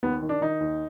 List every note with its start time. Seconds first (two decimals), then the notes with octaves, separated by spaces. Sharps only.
0.03 D#2 B3
0.23 D#3
0.29 D4
0.41 D#3 D#4
0.60 D#2